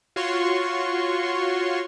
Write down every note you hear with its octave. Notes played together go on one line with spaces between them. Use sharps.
F4 F#4 C#5 C6 C#6